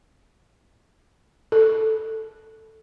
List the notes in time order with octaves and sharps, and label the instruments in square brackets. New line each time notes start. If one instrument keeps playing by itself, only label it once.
[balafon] A4